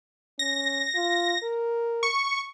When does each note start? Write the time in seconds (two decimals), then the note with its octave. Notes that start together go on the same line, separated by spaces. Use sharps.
0.39 C#4 A#6
0.95 F4
1.43 A#4
2.03 C#6